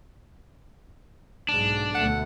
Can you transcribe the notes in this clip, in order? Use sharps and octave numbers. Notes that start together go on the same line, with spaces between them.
B1 G#2 D4
D2 B2 A3 F#5